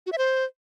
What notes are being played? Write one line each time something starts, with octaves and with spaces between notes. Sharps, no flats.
F#4
E5
C5